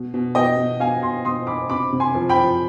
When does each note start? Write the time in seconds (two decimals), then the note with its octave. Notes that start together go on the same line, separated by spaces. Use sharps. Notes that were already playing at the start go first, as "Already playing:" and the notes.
Already playing: B2
0.14 B2
0.35 B2 D#5 G5
0.57 B2
0.80 B2 F5 G#5
1.02 B2 G#5 C6
1.25 B2 C6 D#6
1.47 B2 B5 D6
1.70 C3 B5 D6
1.93 C3
2.00 G#5 C6
2.14 F3
2.29 G5 B5
2.37 F3